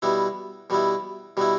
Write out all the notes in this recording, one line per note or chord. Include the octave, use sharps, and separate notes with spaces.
B2 G3 B3 E4
B2 G3 B3 E4
B2 G3 B3 E4